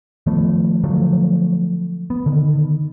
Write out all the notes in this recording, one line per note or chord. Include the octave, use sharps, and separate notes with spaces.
D#3 F3 A3 B3
D3 F3 F#3 A3
B3
D3 D#3